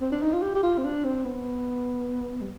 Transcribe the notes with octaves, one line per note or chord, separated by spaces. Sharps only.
C4
D4
D#4
F4
G4
G4
F4
C4
D4
C4
B3
G3